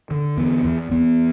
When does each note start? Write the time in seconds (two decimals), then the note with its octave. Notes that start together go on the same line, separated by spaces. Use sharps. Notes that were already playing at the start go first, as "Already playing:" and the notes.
0.11 D3
0.37 E2 B3
0.64 E2
0.91 E2 B3